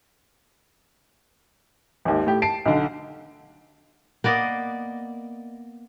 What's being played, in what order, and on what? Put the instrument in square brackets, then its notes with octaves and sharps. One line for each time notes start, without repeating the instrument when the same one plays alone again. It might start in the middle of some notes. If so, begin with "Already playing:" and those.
[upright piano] G#1 D#2
A2 G4
A5 C7 D7
B1 D3
[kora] A#3 B3 D5 D#5